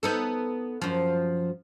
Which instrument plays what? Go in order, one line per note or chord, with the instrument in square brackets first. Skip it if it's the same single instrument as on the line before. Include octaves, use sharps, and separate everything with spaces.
[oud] B3 D#4 A4
F#2 F3